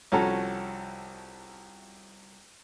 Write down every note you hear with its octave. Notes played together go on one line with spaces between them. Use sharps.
C2 F3 C#4 F#4 A4 A#5